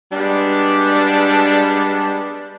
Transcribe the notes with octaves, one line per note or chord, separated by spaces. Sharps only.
G3 G#3 B3 D4